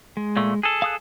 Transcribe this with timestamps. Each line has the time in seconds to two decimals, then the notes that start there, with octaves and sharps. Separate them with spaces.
0.17 G#3
0.36 A#2 A3
0.63 G#4 A4
0.82 F5 D#6 F#6